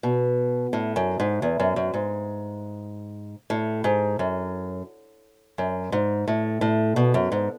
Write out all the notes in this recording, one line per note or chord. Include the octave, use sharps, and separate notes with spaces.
B2
A2
F#2
G#2
E2
F#2
F#2
G#2
A2
G#2
F#2
F#2
G#2
A2
A2
B2
F#2
G#2